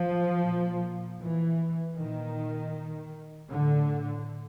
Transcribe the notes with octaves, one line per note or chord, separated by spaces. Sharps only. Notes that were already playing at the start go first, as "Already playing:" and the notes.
Already playing: F3
A#2
E3
A#2 D#3
A2 D3